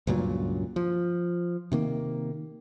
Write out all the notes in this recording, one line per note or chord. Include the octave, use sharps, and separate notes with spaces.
C#2 G2 A#2 F#3
F3
C3 D#3 A#3